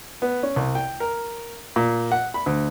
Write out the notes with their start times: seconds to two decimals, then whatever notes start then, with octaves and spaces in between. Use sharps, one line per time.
0.22 B3
0.43 C#4
0.56 C2
0.75 G5
1.00 A#4
1.76 A#2
2.12 F#5
2.34 B5
2.46 D2